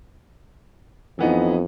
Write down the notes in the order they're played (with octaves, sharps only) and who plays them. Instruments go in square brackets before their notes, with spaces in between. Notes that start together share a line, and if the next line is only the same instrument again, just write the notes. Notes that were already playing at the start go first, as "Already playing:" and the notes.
[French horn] F2 [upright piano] E3 B3 D#4